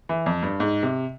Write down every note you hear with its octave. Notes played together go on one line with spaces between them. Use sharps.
E3
F2
G2
G#2
C3